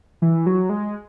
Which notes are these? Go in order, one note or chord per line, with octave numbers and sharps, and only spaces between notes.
E3
F#3
G#3